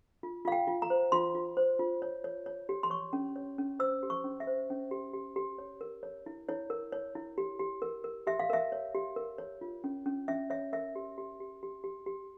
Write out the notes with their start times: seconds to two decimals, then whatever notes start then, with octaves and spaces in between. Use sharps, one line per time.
0.23 F4
0.45 F4 F5
0.52 G5
0.67 F4
0.82 A#5
0.90 C5
1.12 F4 C6
1.35 F4
1.57 C5
1.79 F4
2.02 C#5
2.24 C#5
2.46 C#5
2.69 G4
2.83 C6
2.90 C#5 C#6
3.13 C#4
3.36 C#5
3.58 C#4
3.80 C5 E6
4.03 G4
4.10 C#6
4.24 C#4
4.40 E5
4.47 C5
4.70 C#4
4.91 G4
5.14 G4
5.36 G4
5.58 C#5
5.81 A#4
6.03 C#5
6.26 E4
6.49 E4 C#5
6.70 A#4
6.92 C#5
7.15 E4
7.38 G4
7.59 G4
7.82 A#4
8.04 A#4
8.27 G4 E5
8.39 F5
8.50 A#4 E5
8.72 C#5
8.95 G4
9.16 A#4
9.38 C#5
9.61 F4
9.84 C#4
10.06 C#4
10.28 C#4 E5
10.50 C#5 E5
10.73 A#4 E5
10.96 G4
11.18 G4
11.40 G4
11.63 G4
11.84 G4
12.06 G4